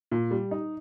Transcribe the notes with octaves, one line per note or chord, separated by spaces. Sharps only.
A#2
G3
D#4